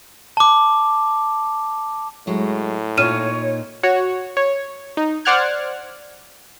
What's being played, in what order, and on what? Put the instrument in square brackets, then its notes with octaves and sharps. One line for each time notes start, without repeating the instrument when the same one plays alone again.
[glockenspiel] A5 D6
[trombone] A2 [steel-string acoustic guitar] F#3 G#3
[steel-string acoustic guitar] A#2 D#4 F4 [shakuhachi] C#5 [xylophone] F6 D#7 E7
[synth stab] F#4 C#5
C#5
D#4
C5 D5 F#5 F6 F#6 G#6